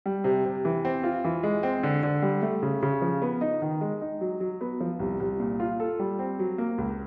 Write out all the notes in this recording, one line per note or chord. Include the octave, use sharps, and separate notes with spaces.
G3
C3
C3
E3
C4
F4
E3
G#3
C4
D3
D3
G3
A3
C#3
C#3
F3
B3
D#4
D#3
G#3
D#4
F#3
F#3
B3
F3
C2
C2
A#2
F4
A4
G3
C4
F#3
A#3
C#2